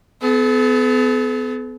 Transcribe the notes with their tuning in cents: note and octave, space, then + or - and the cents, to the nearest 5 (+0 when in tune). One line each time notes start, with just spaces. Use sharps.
B3 +30 A4 -45